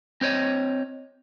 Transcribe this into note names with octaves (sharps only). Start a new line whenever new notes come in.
C4 C5 C#5 D#5